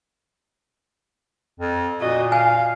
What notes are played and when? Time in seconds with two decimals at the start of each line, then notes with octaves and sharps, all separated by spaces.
1.60 F2
2.00 A#2 F#4 D#5
2.32 F5 G#5